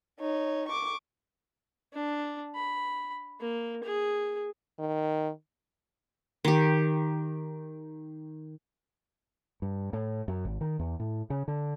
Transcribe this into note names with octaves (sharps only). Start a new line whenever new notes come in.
D#4 C#5
C#6 D6
D4
B5
A#3
G#4
D#3
D#3 G4
G2
A2
F#2
G#1
D#3
E2
A2
C#3
D3